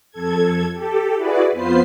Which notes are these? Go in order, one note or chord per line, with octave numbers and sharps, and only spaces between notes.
F2 A4 G#6
G4 A4
E4 F#4 G#4 B4 D5
F2 B3 F4 B4 C5 C7